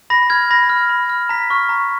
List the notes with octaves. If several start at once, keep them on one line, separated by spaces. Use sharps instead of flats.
B5 A#6
F6 G#6
B5 A#6
F6
B5
F6
A#5 B6
C#6 F6
A#5